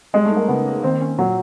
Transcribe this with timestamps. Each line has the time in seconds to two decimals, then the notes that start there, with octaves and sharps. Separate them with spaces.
0.13 G3 G#3
0.25 A3
0.31 D#4
0.36 A#3
0.48 C#3 B3
0.66 A#3
0.83 D#3 C4
1.01 C#4
1.18 A#2 F#3